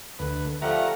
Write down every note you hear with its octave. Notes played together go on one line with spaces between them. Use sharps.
D2 B4
F3 G3 A3 F#5 A#5